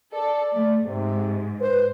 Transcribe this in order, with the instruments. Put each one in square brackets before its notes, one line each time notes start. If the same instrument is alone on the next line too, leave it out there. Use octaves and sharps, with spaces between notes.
[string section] A4 [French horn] D5
[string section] A3
[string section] G#2 [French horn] C3
[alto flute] B4 [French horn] C5